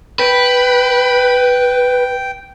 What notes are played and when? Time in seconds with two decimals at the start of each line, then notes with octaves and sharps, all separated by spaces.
0.19 B4 G5